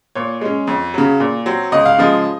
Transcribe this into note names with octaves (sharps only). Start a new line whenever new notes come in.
A#2 C#5
G#3 C#4
F2
C#3 F#3
A#2
F#3 C4
C#2 D#5
F5
C#3 F3 G#3 D#5